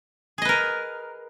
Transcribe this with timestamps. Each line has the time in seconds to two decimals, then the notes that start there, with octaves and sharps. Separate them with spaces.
0.38 G#4
0.42 D#5
0.45 B4
0.49 A#4